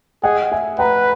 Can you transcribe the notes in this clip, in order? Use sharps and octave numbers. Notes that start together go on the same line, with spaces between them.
G#4 D#5 F#5
E5 G#5
B4 F#5 A#5